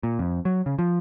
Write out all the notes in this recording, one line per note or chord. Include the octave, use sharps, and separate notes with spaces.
A#2
F2
F#3
C#3
F3